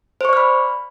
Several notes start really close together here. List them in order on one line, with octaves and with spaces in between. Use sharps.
C5 C#6 D5 F6 B5